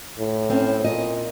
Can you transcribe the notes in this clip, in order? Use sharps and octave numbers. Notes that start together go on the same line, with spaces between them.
A2
C4 C#4
A#2 D#5